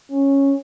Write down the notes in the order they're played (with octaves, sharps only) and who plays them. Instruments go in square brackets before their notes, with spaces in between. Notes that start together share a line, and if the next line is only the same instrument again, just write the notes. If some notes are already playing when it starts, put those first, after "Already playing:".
[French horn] C#4